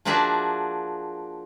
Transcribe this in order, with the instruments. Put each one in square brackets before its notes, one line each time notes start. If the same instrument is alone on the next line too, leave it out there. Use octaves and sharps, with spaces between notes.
[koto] F3 A#3 D4 F#4 G#4 E5